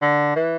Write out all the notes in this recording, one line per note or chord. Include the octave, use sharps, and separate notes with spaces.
D3
E3